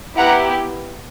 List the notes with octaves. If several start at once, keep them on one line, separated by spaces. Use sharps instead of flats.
B3 E4 G4 F#5 A#5